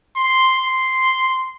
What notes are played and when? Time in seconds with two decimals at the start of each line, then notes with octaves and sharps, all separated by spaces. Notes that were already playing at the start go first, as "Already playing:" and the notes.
0.17 C6
0.60 C6